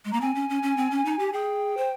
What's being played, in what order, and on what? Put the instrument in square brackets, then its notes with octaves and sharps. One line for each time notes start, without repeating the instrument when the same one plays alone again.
[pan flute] G#3
[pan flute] A#3 [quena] A#5
[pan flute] C4 [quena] G#5
[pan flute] C#4
C#4
C#4
C4
C#4
D#4
G4
[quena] G#5
[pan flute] G#4 [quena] G5
[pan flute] C5